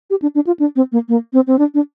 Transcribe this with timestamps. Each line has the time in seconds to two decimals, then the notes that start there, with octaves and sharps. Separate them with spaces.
0.10 G4
0.22 D4
0.35 D4
0.47 F4
0.59 D4
0.76 C4
0.92 A#3
1.09 A#3
1.33 C4
1.47 C4
1.59 D4
1.74 D4